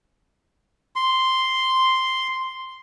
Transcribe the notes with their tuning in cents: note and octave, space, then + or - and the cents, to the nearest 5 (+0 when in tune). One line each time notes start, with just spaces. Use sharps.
C6 +0